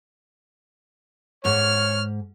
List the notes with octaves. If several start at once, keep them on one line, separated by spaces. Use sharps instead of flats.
G#2 C#5 F6